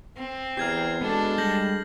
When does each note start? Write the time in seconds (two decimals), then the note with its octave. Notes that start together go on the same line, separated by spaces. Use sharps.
0.17 C4
0.57 E2 G4 G#5 A#5 F6 G#6 C7
1.01 G#3 B3 D4 F#4 A4
1.38 G3 G6 A#6 F#7